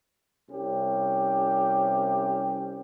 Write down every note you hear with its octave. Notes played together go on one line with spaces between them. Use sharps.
C2 C#4 G4